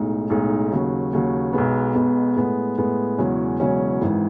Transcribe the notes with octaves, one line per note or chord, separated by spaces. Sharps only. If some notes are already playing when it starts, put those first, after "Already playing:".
Already playing: B1 A2 G#3 D#4
B1 A2 G#3 D#4
D#2 C#3 F#3
D#2 C#3 F#3
B1 B2 G#3 B3
B1 B2 G#3 B3
A2 G#3 B3
A2 G#3 B3
E1 E2 C#3 F#3 C#4
E1 E2 C#3 F#3 C#4
G#1 G#2 E3